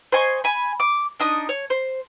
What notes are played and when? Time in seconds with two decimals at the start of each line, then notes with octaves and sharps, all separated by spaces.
0.12 C5 D#5 G#5 C#6
0.44 G#5 B5
0.80 D6
1.20 D4 D#4 D#6
1.49 C#5
1.70 C5